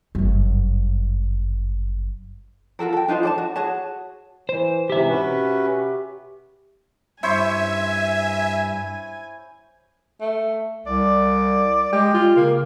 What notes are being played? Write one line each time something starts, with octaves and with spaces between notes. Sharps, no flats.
G1 F#2
F4 F#4 A4 A#4
A4 G5
D4 D#4 F4 C5
A4 D5 A5
F#4
F#4 G#4 C#5 A5
E3 C5
G#2 C3 E3 G4 E5
C#4 F#4 B4
G2 E4 C5 C#5 E5 G#5
A3
C2 D5
G#3 G4
F4
C#3 A#3